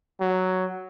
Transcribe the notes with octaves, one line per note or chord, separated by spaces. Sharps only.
F#3